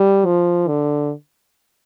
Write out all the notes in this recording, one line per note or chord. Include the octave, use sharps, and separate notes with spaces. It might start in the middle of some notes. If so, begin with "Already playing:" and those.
Already playing: G3
F3
D3